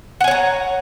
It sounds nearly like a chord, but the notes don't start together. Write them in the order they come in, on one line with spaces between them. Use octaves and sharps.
F#5 G#5 C#5 A#5